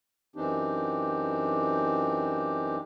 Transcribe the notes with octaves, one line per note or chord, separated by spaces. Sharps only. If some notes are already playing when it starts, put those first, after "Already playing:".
F#2 E3 C4 D4 D#4 G4